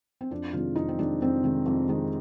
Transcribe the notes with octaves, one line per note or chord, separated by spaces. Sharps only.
C4
F2 D4
C3 D#3 G#3 F4
F2 D#4
C4
C3 D#3 G#3 D4
F2 C4
C3 D#3 G#3
F2
C3 D#3 G#3